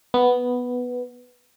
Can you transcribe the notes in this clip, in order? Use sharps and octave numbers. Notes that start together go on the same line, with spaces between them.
B3